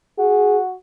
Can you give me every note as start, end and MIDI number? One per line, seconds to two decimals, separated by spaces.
0.18 0.74 66
0.18 0.58 68